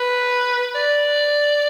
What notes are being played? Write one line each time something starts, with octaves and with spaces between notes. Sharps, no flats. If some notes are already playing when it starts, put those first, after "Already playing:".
Already playing: B4
D5